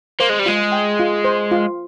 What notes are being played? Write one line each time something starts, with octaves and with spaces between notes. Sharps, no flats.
A#3 C5
G#3
G3
G#3 F4
G5
F4
C5
F4